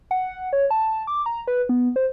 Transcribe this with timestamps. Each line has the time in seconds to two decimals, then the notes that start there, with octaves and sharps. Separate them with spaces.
0.11 F#5
0.53 C#5
0.71 A5
1.07 D6
1.26 A#5
1.47 B4
1.69 B3
1.96 C5